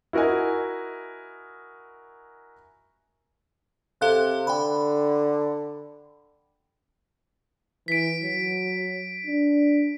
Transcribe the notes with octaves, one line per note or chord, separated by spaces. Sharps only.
E4 F#4 A#4 D#5 G#5
C3 A4 F5 F#6
D3 G5 B5
E3 B6 D7
F#3
D4